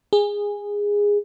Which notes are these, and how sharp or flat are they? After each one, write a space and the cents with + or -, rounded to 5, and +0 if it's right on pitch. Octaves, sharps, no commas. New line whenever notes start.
G#4 -15